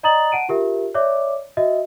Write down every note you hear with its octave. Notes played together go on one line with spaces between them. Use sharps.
D5 D#5 A#5 D#6 A6 F#7
F#5 A5 D7 D#7
F4 G4 A#4 E5
C#5 D5 E5 D6
F#4 D#5 E5